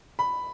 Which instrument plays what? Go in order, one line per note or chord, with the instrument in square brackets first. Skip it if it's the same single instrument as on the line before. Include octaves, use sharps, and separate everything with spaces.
[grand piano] B5